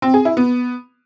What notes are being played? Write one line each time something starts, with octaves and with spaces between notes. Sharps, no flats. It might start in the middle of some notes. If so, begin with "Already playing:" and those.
C4
G#4
E4
B3